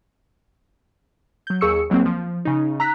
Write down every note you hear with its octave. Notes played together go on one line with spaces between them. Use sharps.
F#3 G6
D#2 G#4 C#6 E6 C#7
C#2 F#3 A#3 C4
F3
C#3 D#4
A#5 E6 F#6 B6